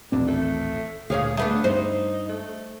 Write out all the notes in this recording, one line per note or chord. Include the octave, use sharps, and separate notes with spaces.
D#1 A1 C4 D4
A3
D2 A#2 G#4 C#5 F5
A3 B3 D4 G#4
G2 D#4 C5
A3